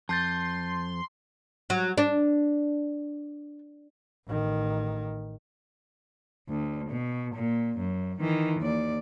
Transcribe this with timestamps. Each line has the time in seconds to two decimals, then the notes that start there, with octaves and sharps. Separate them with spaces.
0.09 F2 A5 C6 G6 A6
1.70 F#3
1.98 D4
4.27 A1 D#3
6.49 D2
6.90 B2
7.35 A#2
7.78 F#2
8.21 D#3 E3
8.61 D#2 D5